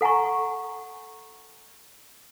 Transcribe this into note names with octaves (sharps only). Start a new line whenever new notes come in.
A4 F#5 G#5 A#5 C#6